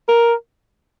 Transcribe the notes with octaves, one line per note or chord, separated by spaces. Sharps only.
A#4